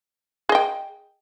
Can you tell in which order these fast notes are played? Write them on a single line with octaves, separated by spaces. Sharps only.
G#4 D#5 G5